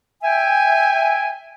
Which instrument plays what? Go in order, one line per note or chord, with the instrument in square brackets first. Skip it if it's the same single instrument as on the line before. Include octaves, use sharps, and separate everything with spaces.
[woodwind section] E5 G5 G#5